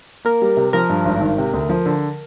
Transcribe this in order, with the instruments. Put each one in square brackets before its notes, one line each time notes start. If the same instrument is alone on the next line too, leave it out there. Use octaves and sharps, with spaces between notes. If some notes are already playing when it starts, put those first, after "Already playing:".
[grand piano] A#3 [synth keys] A#4
[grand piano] G3
C3
[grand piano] F3 [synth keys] A#4
[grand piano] G2
G#1
D#3
C3
D2
F3
D3